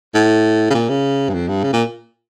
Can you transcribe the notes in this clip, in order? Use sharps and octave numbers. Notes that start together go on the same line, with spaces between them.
A2
C#3
A#2
C#3
G2
F2
G2
C#3
A#2